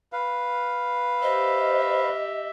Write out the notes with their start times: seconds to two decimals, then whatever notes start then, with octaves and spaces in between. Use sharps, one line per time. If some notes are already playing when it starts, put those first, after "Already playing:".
0.12 B4 F5
1.22 G4 C5 D#5 E5